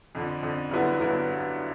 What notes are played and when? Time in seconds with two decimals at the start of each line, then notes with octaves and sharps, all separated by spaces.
0.15 F2 D3 F3
0.43 F2 D3 F3
0.71 G2 D3 F#3 B3 E4
1.00 D3 F#3 B3 E4